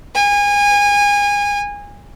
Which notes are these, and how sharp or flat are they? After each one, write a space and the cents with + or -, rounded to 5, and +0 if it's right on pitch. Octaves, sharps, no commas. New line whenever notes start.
G#5 -30